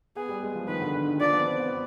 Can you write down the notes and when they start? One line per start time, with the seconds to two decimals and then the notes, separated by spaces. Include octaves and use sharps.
0.16 B3 G#4
0.29 G3
0.43 G#3
0.55 F3
0.68 D#3 B4
0.82 D3
0.95 D3
1.08 D#3
1.21 F3 D5
1.33 B3
1.47 C4
1.60 B3